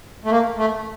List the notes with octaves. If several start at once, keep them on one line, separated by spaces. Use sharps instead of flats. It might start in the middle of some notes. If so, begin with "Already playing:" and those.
A3
A#3
A3